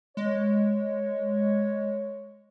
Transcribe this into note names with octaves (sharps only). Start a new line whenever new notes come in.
G#3 C#5